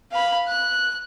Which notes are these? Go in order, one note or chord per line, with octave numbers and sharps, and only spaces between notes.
F5 B5
F#6